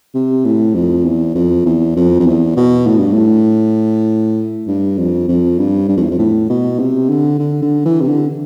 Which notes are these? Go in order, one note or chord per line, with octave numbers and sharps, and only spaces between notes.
C3
A2
F2
E2
F2
E2
F2
F2
E2
B2
A2
G2
A2
G2
F2
F2
G2
G2
F2
E2
F2
A2
B2
C3
D3
D3
D3
E3
C3
D3